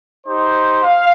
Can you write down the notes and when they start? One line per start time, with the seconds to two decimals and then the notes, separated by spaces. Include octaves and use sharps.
0.23 D#4 G4 C5
0.84 F5